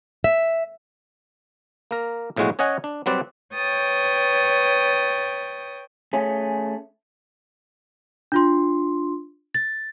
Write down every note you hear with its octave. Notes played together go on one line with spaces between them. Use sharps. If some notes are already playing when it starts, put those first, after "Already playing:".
E5
A#3 A#4
B1 A2 F3 G#3 F#4
C#4 C#5 D#5 F#5 G#5
D4
F#3 G3 C4 B4 D5
B4 C#5 G5 D#6 A6
A3 C#4 G#4
D4 F4 C6
A6